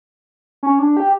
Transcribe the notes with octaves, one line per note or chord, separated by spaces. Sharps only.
C#4
D4
G4